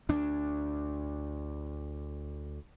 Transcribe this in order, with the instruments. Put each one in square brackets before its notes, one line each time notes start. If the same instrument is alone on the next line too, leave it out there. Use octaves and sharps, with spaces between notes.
[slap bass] D2 D4